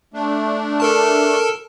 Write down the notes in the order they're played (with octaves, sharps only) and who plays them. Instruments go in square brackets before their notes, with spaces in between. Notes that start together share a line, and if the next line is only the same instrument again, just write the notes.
[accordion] A3 D4
[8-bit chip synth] A4 A#4 A5